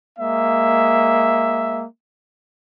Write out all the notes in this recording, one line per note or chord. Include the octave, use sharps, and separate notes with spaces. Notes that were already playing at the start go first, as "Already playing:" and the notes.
G#3 A#3 E5